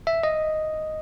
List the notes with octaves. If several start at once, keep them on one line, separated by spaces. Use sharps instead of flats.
E5
D#5